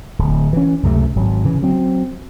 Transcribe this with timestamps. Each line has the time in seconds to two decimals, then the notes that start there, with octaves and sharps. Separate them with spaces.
0.19 D1
0.53 E3 C#4
0.83 C#2 F#2 C3 A3
1.16 G#1 F#3
1.45 C#3 E3
1.62 F#3 C4